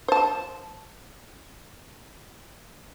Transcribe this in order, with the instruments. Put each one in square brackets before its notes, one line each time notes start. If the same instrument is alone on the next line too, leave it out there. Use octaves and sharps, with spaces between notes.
[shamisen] C5 A5